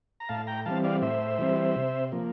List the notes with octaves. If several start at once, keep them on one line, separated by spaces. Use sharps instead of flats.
A#5
A2 F5 A5
G5 A#5
E3 G3 C4 F5 A5
D5 F5
A2 C5 E5
E3 G3 C4
C3
F3 A#3